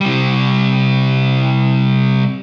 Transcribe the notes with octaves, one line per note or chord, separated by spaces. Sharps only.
C3 G3